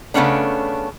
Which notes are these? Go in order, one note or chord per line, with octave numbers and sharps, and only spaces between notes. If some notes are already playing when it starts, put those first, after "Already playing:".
C#3 A3 B3 C#4 D4